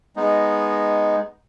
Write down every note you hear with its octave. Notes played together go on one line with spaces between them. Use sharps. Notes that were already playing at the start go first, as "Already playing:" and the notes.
G#3 B3 D#4